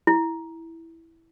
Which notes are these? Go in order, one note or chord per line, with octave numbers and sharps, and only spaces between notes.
E4